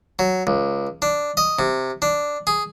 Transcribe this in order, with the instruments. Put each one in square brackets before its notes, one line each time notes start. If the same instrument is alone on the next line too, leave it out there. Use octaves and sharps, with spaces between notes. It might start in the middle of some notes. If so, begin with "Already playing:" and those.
[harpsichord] F#3
C#2
D4
D#5
C3
D4
G#4